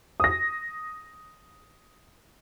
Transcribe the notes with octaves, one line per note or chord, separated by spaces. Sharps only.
D#6 A#6